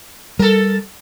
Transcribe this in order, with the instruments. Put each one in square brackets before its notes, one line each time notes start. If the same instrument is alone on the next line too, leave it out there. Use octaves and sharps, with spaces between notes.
[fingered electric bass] G3 [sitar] A4 A#4